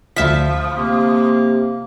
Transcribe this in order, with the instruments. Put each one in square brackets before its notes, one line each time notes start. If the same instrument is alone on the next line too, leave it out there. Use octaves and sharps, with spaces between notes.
[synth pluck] D2 E5 B6 [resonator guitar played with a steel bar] F3
[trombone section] C3 [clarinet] A#3